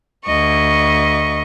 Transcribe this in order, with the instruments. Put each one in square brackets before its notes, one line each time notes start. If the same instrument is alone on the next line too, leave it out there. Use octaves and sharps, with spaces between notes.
[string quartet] D2 D#5 C#6